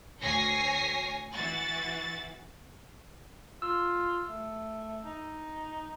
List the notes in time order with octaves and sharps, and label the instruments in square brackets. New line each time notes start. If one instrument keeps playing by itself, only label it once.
[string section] D2 C#5 G#5 A#6 C7
E3 F#4 A6
[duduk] F4 [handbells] E6
[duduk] A3
D#4